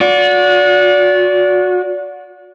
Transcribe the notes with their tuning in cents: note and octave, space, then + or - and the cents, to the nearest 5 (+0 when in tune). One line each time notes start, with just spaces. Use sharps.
F#4 -30 D5 -25